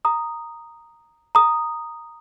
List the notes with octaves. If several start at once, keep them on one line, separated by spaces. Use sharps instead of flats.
A#5 D#6
A#5 D#6